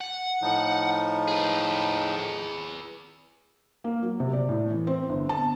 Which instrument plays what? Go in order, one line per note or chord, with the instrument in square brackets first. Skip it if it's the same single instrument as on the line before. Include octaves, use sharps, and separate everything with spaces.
[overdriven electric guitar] F#5
[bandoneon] A2 F3 D#4
[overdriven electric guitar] G#4 B4
[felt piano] A#3
F#3
C3
D5
A2
E3
C4
G1
A5